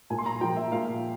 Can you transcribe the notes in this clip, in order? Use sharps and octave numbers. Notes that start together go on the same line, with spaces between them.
A#2 G#5
C6
A#5
F3 A#3 G5
E5
A#2 F5